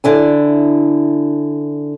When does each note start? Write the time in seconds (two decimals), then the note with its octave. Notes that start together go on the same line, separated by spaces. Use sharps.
0.04 D3 D4 E4 G#5